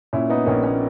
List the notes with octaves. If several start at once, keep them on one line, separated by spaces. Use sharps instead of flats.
A#2 C#4 E4
B3 D#4
A#1 A#3 C#4
A#3 C#4